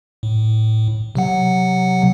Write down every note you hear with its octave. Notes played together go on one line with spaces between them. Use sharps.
A2
C3 F#3 F#5